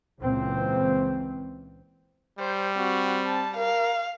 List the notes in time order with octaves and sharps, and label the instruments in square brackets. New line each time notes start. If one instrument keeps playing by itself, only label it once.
[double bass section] C#2 A#2 C#3 E3 C4
[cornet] G3 [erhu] C5
[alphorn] C4 [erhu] F#4
[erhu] A5
[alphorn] A#4 [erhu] F5